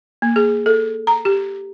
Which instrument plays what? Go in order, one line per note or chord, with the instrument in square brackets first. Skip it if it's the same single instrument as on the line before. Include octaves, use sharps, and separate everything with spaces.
[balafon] A#3
G#4
A4
A#5
G4